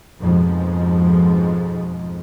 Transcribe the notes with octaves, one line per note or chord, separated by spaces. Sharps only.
F2 G#2 B2 F3 G#3